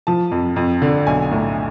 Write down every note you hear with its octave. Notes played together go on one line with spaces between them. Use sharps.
F3 A5
F2
F2
D3
B1 G#5
A2